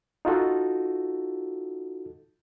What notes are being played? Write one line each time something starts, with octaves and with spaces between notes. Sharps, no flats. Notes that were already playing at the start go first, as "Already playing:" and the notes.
D#4 F4 F#4 A4